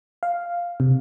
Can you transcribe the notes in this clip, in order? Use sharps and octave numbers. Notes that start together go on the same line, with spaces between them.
F5
C3